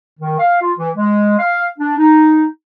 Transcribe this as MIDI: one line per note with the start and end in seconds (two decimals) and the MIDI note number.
0.20 0.37 51
0.39 0.59 77
0.61 0.72 65
0.78 0.90 52
0.97 1.36 56
1.39 1.66 77
1.79 1.94 62
1.98 2.44 63